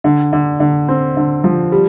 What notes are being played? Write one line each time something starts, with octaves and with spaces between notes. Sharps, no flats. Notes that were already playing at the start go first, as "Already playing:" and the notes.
D3
D3
D3
C4
D3
F3
G3